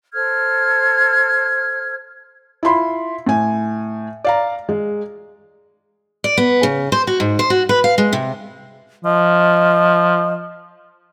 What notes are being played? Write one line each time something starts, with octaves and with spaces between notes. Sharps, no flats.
A4 C5 F6 G#6
E4 F4 B5 C6
A2 G#5
D5 F5 A#5
G#3
D5
B3
C#3
C5
F#4
G#2
C5
F#4
B4
F5
G#3
C3
F3 D#5